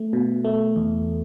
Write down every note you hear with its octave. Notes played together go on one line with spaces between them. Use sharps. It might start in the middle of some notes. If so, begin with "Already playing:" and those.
Already playing: A3
B2
A3
E2